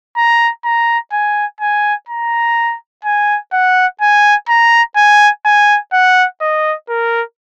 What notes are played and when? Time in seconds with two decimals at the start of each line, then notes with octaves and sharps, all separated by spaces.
0.17 A#5
0.65 A#5
1.12 G#5
1.61 G#5
2.09 A#5
3.05 G#5
3.53 F#5
4.01 G#5
4.49 A#5
4.96 G#5
5.45 G#5
5.93 F#5
6.41 D#5
6.89 A#4